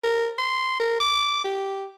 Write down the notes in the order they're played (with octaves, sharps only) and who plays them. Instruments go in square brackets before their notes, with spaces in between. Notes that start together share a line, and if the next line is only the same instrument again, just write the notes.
[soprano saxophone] A#4
C6
A#4
D6
G4